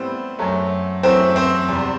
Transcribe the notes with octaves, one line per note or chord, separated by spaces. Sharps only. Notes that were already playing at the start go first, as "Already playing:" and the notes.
Already playing: A2 G3 B3 C4 C5
F#2 F#3 A3
F#2 E3 A3 C4 C5
C4 C5
E2 C3 G3